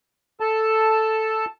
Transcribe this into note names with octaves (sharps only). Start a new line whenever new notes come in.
A4 A5